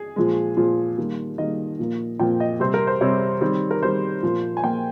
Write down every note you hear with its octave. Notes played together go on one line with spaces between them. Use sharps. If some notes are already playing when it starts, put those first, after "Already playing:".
Already playing: G#4
A#2 F3 G#3
A#2 F3 G#3
D#3 G3 A#3
D#3 G3 A#3 D#5
A#2 F3 A#3
A#2 F3 A#3 G5
D#5
C3 G3 C4 C5
A#4
C5
C3 G3 C4 C#5
D#3 G3 C4
A#4
D#3 G3 C4 C5
A#2 F3 A#3
G#5
A#2 F3 A#3 G5